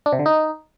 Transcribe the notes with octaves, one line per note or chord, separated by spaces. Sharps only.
D4
C3
D3
D#4